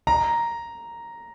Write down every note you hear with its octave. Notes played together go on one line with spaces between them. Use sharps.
A#5